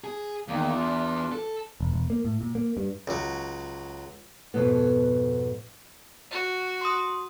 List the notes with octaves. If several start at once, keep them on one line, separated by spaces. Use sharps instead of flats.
G#4
E2 D#3 A#3
D4 F4
A4
E1
E1
A#3
A2
A#2
A#3
G2
C#2 F#3
F2 G#2 B2 B3
F#4
C6 D#6